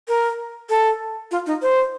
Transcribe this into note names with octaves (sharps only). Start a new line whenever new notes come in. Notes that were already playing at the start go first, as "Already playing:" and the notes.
A#4
A4
F4
D#4
C5